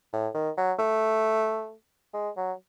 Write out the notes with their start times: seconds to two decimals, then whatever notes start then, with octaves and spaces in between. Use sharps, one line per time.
0.13 A2
0.34 D#3
0.57 F#3
0.79 A3
2.14 G#3
2.37 F#3